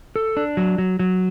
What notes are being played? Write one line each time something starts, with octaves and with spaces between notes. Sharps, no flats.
A4
D4
F#3
F#3
F#3